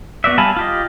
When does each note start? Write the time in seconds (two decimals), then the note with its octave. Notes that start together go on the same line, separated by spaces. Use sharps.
0.24 B3 F#4 D5 E5
0.38 G3 F5 G#5 A5 B5
0.57 F4 G4 D#5